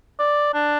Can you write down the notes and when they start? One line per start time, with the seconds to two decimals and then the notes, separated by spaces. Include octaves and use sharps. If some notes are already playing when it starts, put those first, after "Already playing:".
0.20 D5
0.54 D4